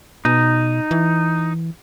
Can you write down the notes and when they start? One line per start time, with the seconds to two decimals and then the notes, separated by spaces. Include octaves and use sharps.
0.25 B2 D#4
0.91 E3